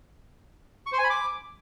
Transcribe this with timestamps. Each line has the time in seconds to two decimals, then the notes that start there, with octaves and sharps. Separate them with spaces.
0.87 C#6
0.92 C5
0.98 G#5
1.04 B5
1.10 D6